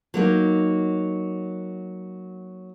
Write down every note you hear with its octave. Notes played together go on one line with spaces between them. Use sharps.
F#3 A#3 D#4